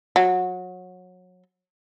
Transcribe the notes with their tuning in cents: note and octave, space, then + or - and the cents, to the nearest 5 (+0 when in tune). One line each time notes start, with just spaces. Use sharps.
F#3 -25